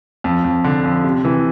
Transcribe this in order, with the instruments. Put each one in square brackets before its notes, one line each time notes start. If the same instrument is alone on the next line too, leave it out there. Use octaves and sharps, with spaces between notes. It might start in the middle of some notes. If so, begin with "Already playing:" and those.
[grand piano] F2
F2
D3
F2
C3
E3